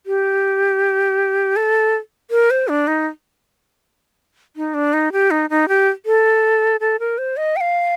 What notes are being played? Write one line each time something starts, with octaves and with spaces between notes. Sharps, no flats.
G4
A4
A#4
C5
D4
D#4
D#4
D4
D#4
G4
D#4
D#4
G4
A4
A4
A#4
C5
D#5
G5
F5